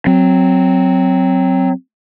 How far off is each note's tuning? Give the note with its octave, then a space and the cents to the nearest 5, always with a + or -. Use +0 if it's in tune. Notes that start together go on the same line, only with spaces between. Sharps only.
F#3 +0 C4 +0